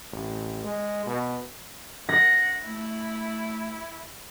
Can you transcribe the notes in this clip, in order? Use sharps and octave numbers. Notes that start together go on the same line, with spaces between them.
A1
G#3
B2
F#5 A#6
A3 E4